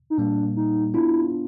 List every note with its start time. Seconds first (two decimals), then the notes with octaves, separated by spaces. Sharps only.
0.10 D#4
0.18 A#2 G3 A#3 D4
0.57 D#4
0.94 B3 D4 E4 F4